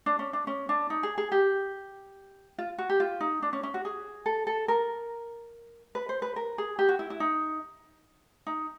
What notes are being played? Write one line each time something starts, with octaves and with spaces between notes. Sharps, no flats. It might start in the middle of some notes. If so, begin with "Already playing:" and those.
D4
C#4
D4
C#4
D4
D#4
G#4
G#4
G4
F4
F#4
G4
F4
D#4
D4
C#4
C#4
F#4
G#4
A4
A4
A#4
B4
C5
B4
A#4
G#4
G4
F#4
E4
E4
D#4
D#4